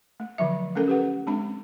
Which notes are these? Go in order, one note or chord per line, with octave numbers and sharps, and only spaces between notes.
A3
D3 F3 F#3 E5
A3 C#4 A4 A#4
G4 B4 F#5
G#3 C4 D4 B5